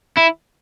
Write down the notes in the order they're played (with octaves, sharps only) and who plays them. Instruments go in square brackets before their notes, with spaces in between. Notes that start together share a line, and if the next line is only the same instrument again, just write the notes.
[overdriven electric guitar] E4